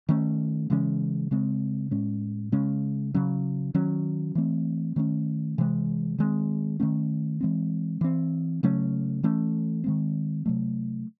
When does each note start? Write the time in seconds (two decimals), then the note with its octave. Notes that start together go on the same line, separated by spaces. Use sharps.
0.09 D#3 A3 C#4
0.70 C#3 E3 G#3 C#4
1.31 C#3 G#3 C4
1.91 A2 G#3 C#4
2.52 C#3 G#3 C#4
3.14 C#3 F#3 C#4
3.74 D#3 F#3 C#4
4.35 E3 A3 C4
4.96 D#3 A3 C#4
5.58 C3 E3 G#3
6.18 D#3 G#3 C4
6.80 D#3 A3 C#4
7.41 E3 G#3 C4
8.01 E3 C4
8.63 C#3 F#3 A3 C#4
9.23 E3 A3 C#4
9.84 D#3 G#3 C4
10.46 C3 F#3 A3